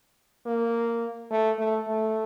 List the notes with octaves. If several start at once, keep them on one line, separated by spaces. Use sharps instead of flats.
A#3
A3
A3
A3